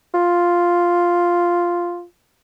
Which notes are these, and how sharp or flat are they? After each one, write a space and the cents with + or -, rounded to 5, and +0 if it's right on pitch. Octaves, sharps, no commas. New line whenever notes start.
F4 +0